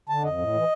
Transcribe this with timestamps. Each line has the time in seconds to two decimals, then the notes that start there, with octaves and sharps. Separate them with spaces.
0.09 D3 A5
0.23 F2 D#5
0.38 A2
0.54 E3